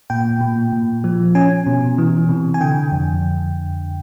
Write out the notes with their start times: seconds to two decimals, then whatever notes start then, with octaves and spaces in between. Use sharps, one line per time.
0.10 A#2 G5
0.41 A#2
0.72 A#2
1.04 F3
1.35 C#4 G#5
1.66 B2
1.98 E3
2.29 C3
2.54 G#5
2.61 D3 G5
2.92 F2